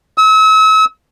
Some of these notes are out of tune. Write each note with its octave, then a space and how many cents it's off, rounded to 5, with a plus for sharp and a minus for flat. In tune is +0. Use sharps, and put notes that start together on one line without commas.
E6 -40